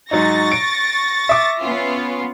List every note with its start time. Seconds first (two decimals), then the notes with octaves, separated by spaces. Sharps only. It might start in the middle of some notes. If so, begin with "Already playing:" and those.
0.11 G#2 F#3 D#4 C#6 A6 A#6
0.52 D7
1.29 E5 D6
1.61 B3 C#4 F4